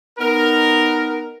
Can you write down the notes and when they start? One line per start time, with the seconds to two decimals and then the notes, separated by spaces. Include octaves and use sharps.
0.19 B3 D#4 A#4